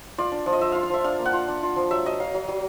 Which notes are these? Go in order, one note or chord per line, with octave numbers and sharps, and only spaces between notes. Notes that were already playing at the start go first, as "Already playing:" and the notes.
F4 D5
D4
F3
D#5
F3 E5
F4 F5
F5
F3 E5
D4 F5
A#3
F#5
F4
D4
F4
F3
F#3 E5
F#3 D#5
F#3 F5
F#3
F#3